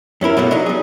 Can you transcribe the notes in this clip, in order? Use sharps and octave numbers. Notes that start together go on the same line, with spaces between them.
F#2 C#4 E4 A#4
B2 F#3 A3 A#3
F#3 D4 D#4
G3 G#4